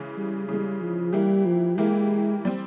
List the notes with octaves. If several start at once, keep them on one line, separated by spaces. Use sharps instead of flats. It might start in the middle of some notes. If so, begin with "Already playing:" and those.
Already playing: C#3 E3 G#3
G3
C#3 E3 G3 G#3
F3
E3 G3 A#3 E4 G4
F3
E3 G#3 A#3 E4 G4
G3 C4